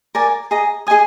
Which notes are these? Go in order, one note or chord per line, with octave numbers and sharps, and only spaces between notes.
A#4 D5 G#5
G#4 D#5 A#5
G#4 D#5 G#5 D#6